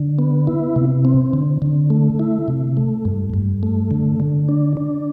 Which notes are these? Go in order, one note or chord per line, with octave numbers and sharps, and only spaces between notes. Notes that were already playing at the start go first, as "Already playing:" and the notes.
Already playing: D3
B3
E4
C3
C4
D3
D3
A3
E4
C3
A3
G2
G2
A3
D3
D3
D4
D4